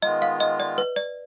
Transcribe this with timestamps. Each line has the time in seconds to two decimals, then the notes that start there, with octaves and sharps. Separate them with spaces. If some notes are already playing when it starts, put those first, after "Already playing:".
0.02 D#3 G#3 B3 F4 D#5
0.22 F5
0.40 D#5
0.60 D5
0.78 B4
0.96 D5